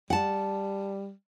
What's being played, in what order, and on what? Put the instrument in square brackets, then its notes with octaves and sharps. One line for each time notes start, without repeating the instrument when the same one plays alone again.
[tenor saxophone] G3 [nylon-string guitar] F#5 A5